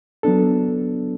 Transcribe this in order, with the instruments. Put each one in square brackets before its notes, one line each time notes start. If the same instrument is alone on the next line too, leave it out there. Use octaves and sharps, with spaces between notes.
[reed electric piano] F#3 B3 D4 A4